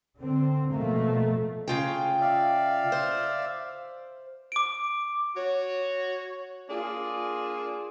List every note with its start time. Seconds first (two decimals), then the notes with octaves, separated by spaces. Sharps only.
0.17 D3 C4
0.72 B2 F3 A3 A#3
1.68 C#3 F4 G#4 G5
2.21 D5 E5 F5
2.92 C5
4.52 D6 D7
5.36 F#4 C#5
6.70 A#3 D4 F4 G#4